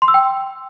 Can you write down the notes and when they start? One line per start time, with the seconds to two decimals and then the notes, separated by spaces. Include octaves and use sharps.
0.02 C6
0.08 E6
0.14 G5